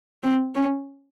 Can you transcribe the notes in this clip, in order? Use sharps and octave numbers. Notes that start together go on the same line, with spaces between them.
C4
C#4